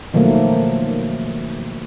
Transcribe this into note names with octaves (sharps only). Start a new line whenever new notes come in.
B2 D#3 F3 F#3 A3 A#3